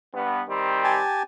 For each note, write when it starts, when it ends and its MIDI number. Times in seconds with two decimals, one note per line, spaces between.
0.14 0.42 43
0.14 0.42 59
0.48 1.01 51
0.48 1.01 55
0.48 1.01 60
0.84 1.23 67
0.84 1.23 80
0.84 1.23 81